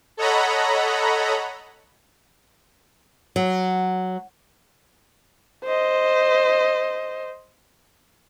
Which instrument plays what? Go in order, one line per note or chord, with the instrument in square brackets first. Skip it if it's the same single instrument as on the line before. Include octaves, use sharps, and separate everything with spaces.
[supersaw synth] A4 C#5 D#5 F#5 A#5 B5
[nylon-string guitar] F#3
[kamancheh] C5 D#5